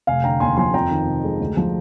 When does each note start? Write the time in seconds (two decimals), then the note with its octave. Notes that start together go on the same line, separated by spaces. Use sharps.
0.07 F1 F5 G#5
0.24 D3 G5 A#5
0.40 D#2 G#5 C6
0.57 F3 G#5 C6
0.74 F2 G5 A#5
0.91 D#3
1.07 C3
1.24 G#3
1.40 D2
1.57 F3